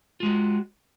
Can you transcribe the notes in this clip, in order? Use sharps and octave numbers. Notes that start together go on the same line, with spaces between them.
G#3 F4 F#4